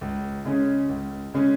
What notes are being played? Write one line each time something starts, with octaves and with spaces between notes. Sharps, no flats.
C#2
C#3 G#3 C#4
C#2
C#3 G#3 C#4